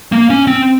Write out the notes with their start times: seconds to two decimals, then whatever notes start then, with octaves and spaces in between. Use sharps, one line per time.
0.12 A#3
0.30 C#4
0.47 C4